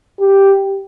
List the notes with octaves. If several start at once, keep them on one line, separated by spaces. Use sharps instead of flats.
G4